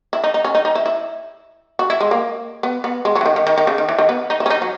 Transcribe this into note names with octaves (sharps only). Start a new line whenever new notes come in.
E4
D#4
D#4
C#4
D#4
D#4
E4
E4
F#4
E4
G#3
A#3
B3
B3
G#3
F#3
E3
D#3
D#3
D#3
D#3
C#3
D#3
E3
D#3
B3
D#4
E4
C#4
D#4
F#3